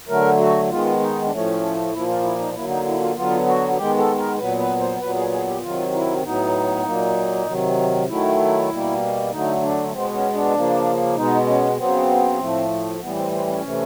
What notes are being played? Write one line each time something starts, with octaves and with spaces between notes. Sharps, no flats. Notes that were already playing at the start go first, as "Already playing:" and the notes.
D3 F#3 A3 A#4
F#4
D#3 G#3 B3 F4
D#4
D4
A2 F3 A3 C#4
A#2 F3 A#3 E4
F4
E4
D#4
D3 F#3 A#3 E4
D#4
E4
F4
D3 F#3 B3 F4
F#4
D#3 G#3 B3 G4
A4
A#4
A#2 F#3 B3 B4
B4
C5
A#2 F#3 B3 B4
G#4
G#4
G4
C3 D#3 F#3 F4
E4
A2 F#3 B3 D#4
A#2 F#3 A#3
C3 D#3 F#3
D#3 F#3 A3 E4
B2 G3 A#3
D3 F#3 A3 D#4
D4
B2 G#3 B3 C4
C#4
D4
C#3 F3 A#3
B2 G#3 B3 D#4
C#4
C#3 F#3 B3 C4
A2 F3 A3
A2 E3 G3 B3
C4
C4
C#4
C3 E3 A3